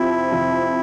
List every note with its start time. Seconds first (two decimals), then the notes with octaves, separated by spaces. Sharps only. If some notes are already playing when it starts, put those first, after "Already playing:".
Already playing: F2 C3 F3 C4 E4
0.31 F2 C3 F3 C4